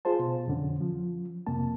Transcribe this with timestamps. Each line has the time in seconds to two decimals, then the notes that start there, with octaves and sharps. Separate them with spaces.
0.05 F4 G#4 C5 A5
0.19 B2
0.48 F2 D3 C#4
0.81 F3
1.47 F2 C3 A#3 A5